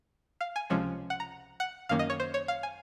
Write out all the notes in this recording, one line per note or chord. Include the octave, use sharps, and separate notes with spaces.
F5
G#5
C#2 C3 F3 G#3 C#4
F#5
A#5
F#5
F#2 D#3 A#3 C#4 F5
D#5
C#5
C5
C#5
F5
G#5